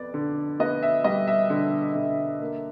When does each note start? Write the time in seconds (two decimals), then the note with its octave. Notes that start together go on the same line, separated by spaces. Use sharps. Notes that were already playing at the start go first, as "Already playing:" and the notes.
Already playing: F2 B3 D5
0.14 D3
0.60 B3 D#5
0.83 E5
1.04 G3 D#5
1.28 E5
1.50 D3
1.95 D3
2.40 A#3